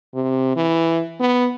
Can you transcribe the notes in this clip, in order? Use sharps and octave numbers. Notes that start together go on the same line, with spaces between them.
C3
E3
B3